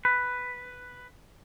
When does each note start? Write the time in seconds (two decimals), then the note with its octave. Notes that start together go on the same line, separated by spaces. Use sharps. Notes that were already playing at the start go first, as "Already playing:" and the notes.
0.05 B4